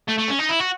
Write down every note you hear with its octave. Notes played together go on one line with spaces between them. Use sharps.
A3
A3
C#4
D#4
E4
F#4